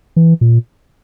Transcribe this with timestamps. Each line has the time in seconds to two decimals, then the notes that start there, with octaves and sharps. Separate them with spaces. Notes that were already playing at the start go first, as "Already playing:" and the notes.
0.16 E3
0.41 A#2